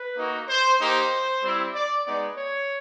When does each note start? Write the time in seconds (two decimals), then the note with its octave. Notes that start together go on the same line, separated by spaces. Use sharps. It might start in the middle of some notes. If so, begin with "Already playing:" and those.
Already playing: B4
0.17 A#3 D#4 F#4
0.48 C5
0.79 A#3 D#4 G4 C5
1.42 G3 C4 E4
1.74 D5
2.05 G#3 B3 D#4 D5
2.36 C#5